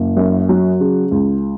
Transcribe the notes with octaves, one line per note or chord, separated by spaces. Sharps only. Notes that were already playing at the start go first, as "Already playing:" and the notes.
Already playing: F#1
F#2
F#3
C#3
C#2